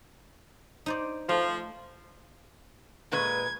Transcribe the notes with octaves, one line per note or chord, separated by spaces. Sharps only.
D#4 C5 D5
F3 A3
A#2 G#3 B4 G#6